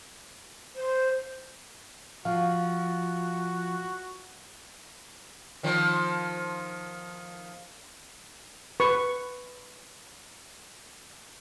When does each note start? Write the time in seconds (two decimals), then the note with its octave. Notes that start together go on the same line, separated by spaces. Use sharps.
0.75 C5
2.25 F3 F#4 F5
5.63 D#3 F3
8.80 B4 C#6